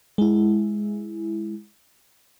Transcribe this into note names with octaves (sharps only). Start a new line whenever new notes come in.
G#3 E4